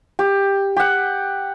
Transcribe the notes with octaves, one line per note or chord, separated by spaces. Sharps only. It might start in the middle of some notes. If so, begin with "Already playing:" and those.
G4
G4 F#5